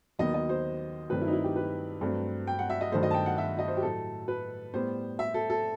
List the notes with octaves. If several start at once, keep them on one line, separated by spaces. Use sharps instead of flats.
D#2 D#3 F#3 B3 D#5
D#5
C5
G2 D#3 F#3 A3 C4 B4
E4
D#4
E4
G4
B4
G2 F#3 A3 C4
G5
F#5
E5
D#5
G2 D#3 F#3 A3 C5
D#5
A5
G5
F#5
E5
D#5
C5
G4
A2 F#3 A3 A4
B4
A2 G3 B3 C5
E5
A4
A4